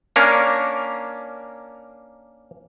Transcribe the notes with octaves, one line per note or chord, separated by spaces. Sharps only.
A#3 C#4 D4 A#4